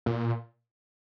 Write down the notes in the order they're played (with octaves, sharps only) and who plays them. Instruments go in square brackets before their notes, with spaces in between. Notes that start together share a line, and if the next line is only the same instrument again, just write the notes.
[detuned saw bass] A#2